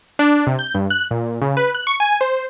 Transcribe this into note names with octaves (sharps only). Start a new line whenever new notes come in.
D4
C3
G6
G2
F#6
A#2
C#3
B4
F#6
C#6
G#5
C5